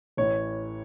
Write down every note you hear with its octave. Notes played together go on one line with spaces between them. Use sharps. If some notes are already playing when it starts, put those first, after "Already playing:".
A1 A2 E3 C#5